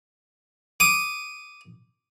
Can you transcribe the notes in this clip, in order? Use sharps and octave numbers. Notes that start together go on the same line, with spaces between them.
D6 D#6